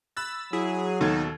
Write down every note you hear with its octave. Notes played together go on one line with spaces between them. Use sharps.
B5 E6 F#6 A6
F#3 E4 G#4
D#2 B2 D#4 A4 G#6